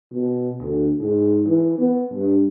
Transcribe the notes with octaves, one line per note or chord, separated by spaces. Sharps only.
B2
D2
G#2
E3
B3
G2